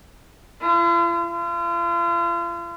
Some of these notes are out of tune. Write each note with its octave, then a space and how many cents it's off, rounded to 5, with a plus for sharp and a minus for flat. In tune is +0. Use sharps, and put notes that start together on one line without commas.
F4 -45
F4 -40